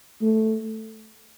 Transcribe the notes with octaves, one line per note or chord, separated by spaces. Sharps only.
A3